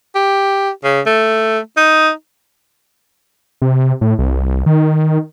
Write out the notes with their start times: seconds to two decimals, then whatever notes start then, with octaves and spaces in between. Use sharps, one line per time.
0.15 G4
0.84 C#3
1.06 A3
1.77 D#4
3.62 C3
4.01 A2
4.19 C2
4.66 D#3